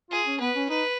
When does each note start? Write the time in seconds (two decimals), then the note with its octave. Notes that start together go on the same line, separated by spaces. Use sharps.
0.10 F4 G#4
0.26 C#4
0.40 B3 B4
0.56 C#4
0.69 D#4 B4